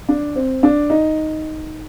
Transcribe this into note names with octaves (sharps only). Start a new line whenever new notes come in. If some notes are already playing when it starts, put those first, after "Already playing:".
D4
C4
D4
D#4